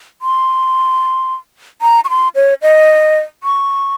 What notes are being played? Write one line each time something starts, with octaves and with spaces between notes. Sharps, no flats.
C6
A#5
C#6
C6
C#5
D#5
C#6